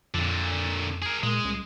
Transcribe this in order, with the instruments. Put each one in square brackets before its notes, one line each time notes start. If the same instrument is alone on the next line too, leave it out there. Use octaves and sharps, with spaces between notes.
[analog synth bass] F2 [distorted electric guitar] A#2 D3
[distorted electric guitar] G#4 A#4
[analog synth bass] A#2 [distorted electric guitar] G#3
[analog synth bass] C#2